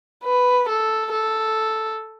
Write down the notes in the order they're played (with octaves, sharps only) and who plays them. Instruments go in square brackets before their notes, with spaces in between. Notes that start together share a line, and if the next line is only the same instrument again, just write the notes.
[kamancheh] B4
A4
A4